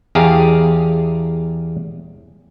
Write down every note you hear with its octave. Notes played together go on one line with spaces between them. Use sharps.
E2 G4 G#4 F5 A5 A#5